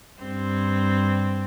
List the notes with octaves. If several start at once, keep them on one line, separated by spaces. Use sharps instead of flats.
G2 C4